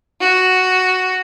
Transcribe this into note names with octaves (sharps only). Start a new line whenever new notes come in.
F#4